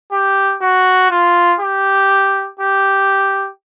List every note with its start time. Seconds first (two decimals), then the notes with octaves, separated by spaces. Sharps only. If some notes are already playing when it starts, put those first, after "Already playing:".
0.12 G4
0.62 F#4
1.10 F4
1.60 G4
2.59 G4